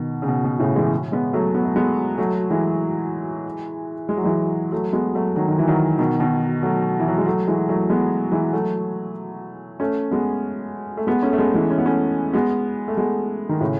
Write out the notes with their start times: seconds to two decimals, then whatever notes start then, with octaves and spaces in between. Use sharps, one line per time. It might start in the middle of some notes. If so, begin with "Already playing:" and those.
Already playing: B2 D#3
0.22 C#3
0.28 B2
0.44 B2
0.59 A2 C#3
0.76 E3 G#3
1.12 G#3 B3
1.33 F#3 A3
1.55 B3
1.65 A3
1.76 G#3 B3
2.18 F#3 A3
2.50 E3 G#3
4.09 G#3
4.17 F#3
4.24 E3 G#3
4.72 F#3 A3
4.93 G#3 B3
5.15 F#3 A3
5.36 D#3 F#3
5.48 D#3
5.58 E3
5.67 D#3 F#3
5.99 B2 D#3
6.20 B2 D#3
6.63 F#3 A3
7.00 E3
7.08 F#3
7.18 G#3
7.26 F#3 A3
7.47 E3 G#3
7.69 F#3 A3
7.89 G#3 B3
8.32 E3 G#3
8.53 F#3 A3
9.80 A3 C#4
10.11 G#3 B3
10.97 A3
11.07 G#3 B3
11.23 A3 C#4
11.33 A3
11.38 G#3 B3
11.54 E3 G#3
11.70 C#4
11.78 B3
11.86 A3 C#4
12.33 G#3 B3
12.88 A3
12.97 G#3 B3
13.49 D#3
13.60 A2 C#3